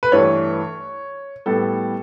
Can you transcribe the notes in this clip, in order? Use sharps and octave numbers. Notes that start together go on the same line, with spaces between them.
B4
G2 E3 A3 C#5
A2 G3 B3 A4